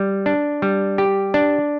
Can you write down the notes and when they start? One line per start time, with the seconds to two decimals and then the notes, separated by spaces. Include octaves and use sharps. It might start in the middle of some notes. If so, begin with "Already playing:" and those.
Already playing: G3
0.26 D4
0.62 G3
0.98 G4
1.34 D4